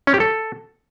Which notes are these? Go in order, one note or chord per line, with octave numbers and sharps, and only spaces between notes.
C#4
G4
A4